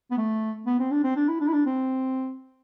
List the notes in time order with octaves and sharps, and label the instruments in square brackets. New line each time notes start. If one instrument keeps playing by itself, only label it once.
[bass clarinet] B3
A3
B3
C4
D4
C4
D4
E4
D4
E4
D4
C4